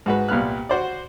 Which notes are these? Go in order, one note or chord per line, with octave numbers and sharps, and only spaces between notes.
G#2 F#4 B4
C2 A#2 B3 F6 F#6
F#4 C5 D5